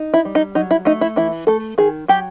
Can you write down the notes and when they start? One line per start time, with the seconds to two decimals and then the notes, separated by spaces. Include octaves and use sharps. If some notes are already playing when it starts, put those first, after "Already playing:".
Already playing: D#4
0.14 E4
0.25 G3
0.35 D#4
0.55 F#3 D#4
0.71 E4
0.85 A3 D#4
1.01 E4
1.16 E3 E4
1.47 A3 A4
1.78 D#3 G#4
2.08 F#3 G4